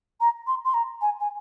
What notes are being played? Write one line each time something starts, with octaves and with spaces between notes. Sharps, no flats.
A#5
C6
C6
A#5
G#5
G#5